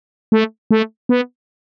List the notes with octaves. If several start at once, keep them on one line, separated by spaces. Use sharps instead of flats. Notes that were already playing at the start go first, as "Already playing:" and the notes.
A3
A3
B3